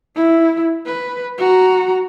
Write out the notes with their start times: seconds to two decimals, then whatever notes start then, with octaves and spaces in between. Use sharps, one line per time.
0.15 E4
0.86 B4
1.38 F#4 A#5